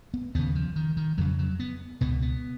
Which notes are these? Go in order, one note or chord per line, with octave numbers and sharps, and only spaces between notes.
B3
D#2 C#3 B3
F3
D#3
D#3
F2 C#3 F#3
F#3
B3
C#2 B2 B3
B3